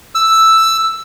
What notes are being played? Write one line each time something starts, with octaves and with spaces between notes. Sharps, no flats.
E6